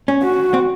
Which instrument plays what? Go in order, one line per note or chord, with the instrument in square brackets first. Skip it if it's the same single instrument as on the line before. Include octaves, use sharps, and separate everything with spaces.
[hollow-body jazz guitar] C#4
[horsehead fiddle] F#4
[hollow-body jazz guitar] C4